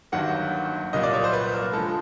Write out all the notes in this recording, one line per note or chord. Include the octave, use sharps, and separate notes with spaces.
G1 G2 D#3 F#3 A#3 F#5
C2 A#2 F#3 A#3 D#5
D5
C#5
C5
B4
A#4
D3 F3 G#3 A4